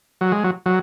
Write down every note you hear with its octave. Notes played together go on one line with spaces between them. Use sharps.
F#3
G#3
F#3
F#3